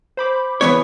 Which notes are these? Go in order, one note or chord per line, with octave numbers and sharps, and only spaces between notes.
C5 B5 D6
E3 B3 C#5